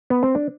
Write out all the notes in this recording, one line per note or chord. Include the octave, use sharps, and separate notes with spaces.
B3
C4
D4